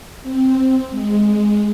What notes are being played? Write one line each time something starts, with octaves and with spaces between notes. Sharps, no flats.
C4
G#3